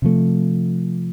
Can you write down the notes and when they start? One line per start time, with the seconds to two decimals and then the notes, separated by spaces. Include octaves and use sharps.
0.02 C3 F3 A3